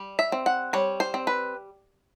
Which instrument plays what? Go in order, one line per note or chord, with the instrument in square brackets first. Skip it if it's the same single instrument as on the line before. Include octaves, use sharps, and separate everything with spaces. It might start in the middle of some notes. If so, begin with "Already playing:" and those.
Already playing: [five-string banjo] G3
E5
C4
F#5
G3 C#5
C5
C4
B4